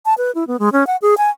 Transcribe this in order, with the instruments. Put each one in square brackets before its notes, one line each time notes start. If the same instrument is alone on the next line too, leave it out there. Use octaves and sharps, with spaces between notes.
[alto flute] A5
B4
E4
B3
G#3
C#4
F#5
G#4
G#5